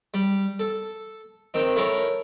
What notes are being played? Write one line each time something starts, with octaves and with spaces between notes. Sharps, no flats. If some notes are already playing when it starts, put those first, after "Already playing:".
G3
A4
D#3 C4 D#4
E4 A4 A#4 C#5